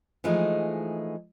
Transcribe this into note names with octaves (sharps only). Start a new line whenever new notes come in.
E3 F3 G#3 A3 D#4 G#4